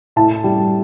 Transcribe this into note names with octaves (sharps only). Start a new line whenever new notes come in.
A2 A5
G3